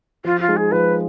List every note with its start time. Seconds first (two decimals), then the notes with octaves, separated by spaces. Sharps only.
0.24 F3 F4
0.40 F4
0.49 G#3 D#4
0.56 G#4
0.71 F3 B4